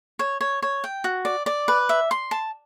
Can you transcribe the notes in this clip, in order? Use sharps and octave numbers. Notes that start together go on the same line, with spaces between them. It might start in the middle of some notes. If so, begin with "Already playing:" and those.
C#5
C#5
C#5
G5
F#4
D5
D5
B4
E5
C6
A5